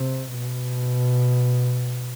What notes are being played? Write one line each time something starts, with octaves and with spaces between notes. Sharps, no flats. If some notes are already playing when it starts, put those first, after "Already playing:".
Already playing: C3
B2